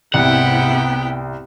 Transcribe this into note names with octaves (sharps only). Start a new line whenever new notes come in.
C2 G#2 C3 B3 E4 F#5 G5